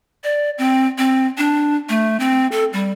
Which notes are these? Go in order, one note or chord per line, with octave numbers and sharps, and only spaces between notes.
D5
C4
C4
D4
A3
C4
A4
G3